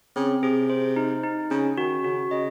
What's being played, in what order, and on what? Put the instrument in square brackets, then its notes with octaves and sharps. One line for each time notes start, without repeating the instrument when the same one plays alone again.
[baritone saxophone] C#3 [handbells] C4
[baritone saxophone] C3 [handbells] G#4
[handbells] C5
D#4
D#4
[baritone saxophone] C#3 [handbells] C#4
[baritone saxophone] D#3 [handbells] F#4
[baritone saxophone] C#3 [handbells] F#4
[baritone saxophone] C#3 [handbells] D#5